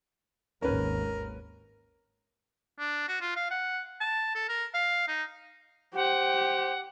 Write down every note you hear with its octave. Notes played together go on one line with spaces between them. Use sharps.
G#1 D#2 G#2 C#4 A#4 B4
D4
F#4
F4
F5
F#5
A5
A4
A#4
F5
D#4
G4 C5 F#5